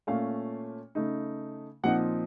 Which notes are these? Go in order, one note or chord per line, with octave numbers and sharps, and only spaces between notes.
A#2 A3 C#4 F5
C#3 A3 D#4
A#2 F3 C4 D#4 F#5